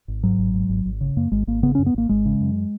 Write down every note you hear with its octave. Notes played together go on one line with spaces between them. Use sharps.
G#1
G#2 F#3
G#1
G#2
G#1
G#1
C#3
F#2 A#3
G#1 G#3
G#1 A#3
C#3 B3
C#4
F#2
B3
G#1 A#3
G#1 G#3
C#3
F#2